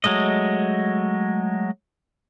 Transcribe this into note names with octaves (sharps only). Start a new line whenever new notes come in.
F#3 G#3 A3 D#5